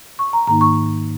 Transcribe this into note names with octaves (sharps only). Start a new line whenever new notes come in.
C#6
A#5
G#2 D#3 A#3 D#4 A#5
C#6